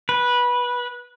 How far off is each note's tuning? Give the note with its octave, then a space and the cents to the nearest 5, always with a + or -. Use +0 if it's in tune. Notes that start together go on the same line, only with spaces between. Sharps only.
B4 -15